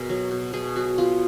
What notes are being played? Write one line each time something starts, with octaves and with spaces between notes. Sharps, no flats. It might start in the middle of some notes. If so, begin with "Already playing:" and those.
Already playing: B2 G#4 A#4
F#3
B2
B2 G#4
F#3 F#4
B3 F4